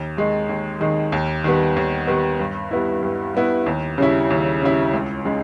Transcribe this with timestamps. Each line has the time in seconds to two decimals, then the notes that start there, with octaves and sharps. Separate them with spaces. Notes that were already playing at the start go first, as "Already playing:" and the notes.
Already playing: D#2
0.17 D#3 G#3 D#4
0.49 D#2
0.80 D#3 G#3 D#4
1.12 D#2
1.44 D#3 G3 B3
1.76 D#2
2.07 D#3 G3 B3
2.39 G2
2.71 G3 B3 E4
3.03 G2
3.34 G3 B3 E4
3.66 D#2
3.98 C#3 G3 C#4 E4
4.30 D#2
4.62 C#3 G3 C#4 E4
4.94 C#2
5.25 C#3 G#3 D#4